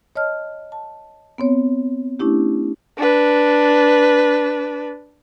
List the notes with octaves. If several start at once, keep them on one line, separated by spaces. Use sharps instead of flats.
C#5 D#5 A5 F6
A5
B3 C4 C#5
A3 C#4 D4 E4 G4
D4 B4